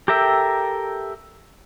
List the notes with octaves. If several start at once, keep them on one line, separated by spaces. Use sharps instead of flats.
G4 A4 A#4 E5 G5